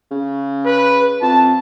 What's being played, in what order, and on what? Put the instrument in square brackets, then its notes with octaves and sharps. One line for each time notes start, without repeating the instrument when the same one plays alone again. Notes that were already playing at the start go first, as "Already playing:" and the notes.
[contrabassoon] C#3
[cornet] B4
[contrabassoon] F2 [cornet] A5